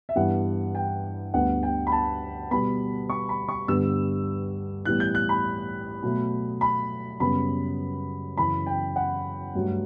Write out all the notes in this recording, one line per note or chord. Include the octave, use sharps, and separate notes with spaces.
E5
G2 E3 G3 B3 F#5
G5
D2 D3 G3 B3 F#5
G5
B5
A5
B2 G3 B3 B5
C#6
B5
C#6
G2 D3 G3 B3 E6
A2 E3 G3 B3 F#6
G6
F#6
B5
B2 F#3 A3
B5
F#2 C#3 G3 B3 B5
F#2 C#3 E3 B5
G5
F#5
G2 F#3 A3